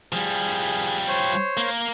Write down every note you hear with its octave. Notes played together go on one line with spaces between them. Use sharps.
F3 G3 G#4
C5 C#5
A#3